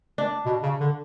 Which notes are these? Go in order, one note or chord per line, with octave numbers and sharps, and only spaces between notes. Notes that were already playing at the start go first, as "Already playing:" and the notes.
D4
B2
C#3
D3